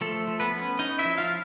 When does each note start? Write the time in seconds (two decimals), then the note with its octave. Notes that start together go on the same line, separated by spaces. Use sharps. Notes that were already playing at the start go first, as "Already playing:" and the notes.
0.01 F3 A3 A4
0.28 F3
0.40 B3 B4
0.53 C#4
0.79 C#4 D#4 D#5
0.99 E4 E5
1.05 F3
1.18 F4 F5